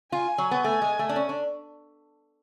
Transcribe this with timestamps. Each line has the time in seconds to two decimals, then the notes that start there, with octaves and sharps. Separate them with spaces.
0.12 F4 G#5
0.38 F#3
0.51 B3
0.64 A3 G#5
0.82 G#3
0.99 A3
1.09 D4
1.16 C#4
1.29 D4